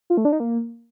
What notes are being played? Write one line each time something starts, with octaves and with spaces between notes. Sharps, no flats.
F4
A3
D4
D#4
A#3